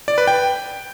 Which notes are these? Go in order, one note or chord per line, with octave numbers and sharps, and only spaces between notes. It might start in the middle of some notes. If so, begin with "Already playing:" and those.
D5
B4
G5